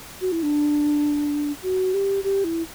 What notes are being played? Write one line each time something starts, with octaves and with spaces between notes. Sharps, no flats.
F#4
E4
D4
F#4
G4
G4
E4